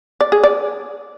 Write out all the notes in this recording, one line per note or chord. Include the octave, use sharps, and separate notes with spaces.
D5
G#4
D5